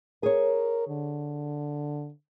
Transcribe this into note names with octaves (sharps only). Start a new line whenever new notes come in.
G#4 A#4 C#5
D3